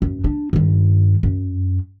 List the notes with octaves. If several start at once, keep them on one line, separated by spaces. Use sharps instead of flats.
F#2
D4
G2 D#3
F#2